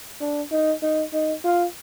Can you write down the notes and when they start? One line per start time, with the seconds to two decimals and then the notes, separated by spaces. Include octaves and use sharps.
0.21 D4
0.52 D#4
0.82 D#4
1.13 D#4
1.44 F4